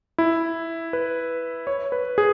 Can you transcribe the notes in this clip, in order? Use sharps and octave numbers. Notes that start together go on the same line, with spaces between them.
E4
B4
C#5
B4
G#4